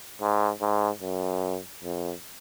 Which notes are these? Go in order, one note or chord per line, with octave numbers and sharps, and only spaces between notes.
G#2
G#2
F#2
F2